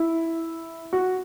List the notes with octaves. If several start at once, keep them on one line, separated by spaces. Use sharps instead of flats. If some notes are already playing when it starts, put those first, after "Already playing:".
Already playing: E4
F#4